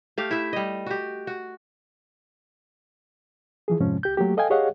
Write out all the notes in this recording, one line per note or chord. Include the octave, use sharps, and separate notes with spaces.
A3 G4 F5
E4 E5
G3 D#5
F#4 G4
F#4
E3 F3 G#4
F2 G#2 C3 F3 G#3 C#4
C#2 G4 G6
F#3 A3 A#3 G4
A4 D#5 F5 G5 G#5
G4 G#4 C#5 D#5 F5 F#5